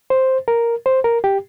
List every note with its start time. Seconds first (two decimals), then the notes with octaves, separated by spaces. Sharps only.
0.10 C5
0.48 A#4
0.86 C5
1.04 A#4
1.24 G4